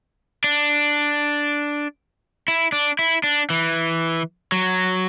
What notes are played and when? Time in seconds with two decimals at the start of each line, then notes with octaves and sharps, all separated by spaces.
0.44 D4
2.48 E4
2.72 D4
2.99 E4
3.24 D4
3.50 E3
4.52 F#3